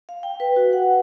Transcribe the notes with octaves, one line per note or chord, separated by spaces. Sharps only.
F5
G5
B4
F#4
F#5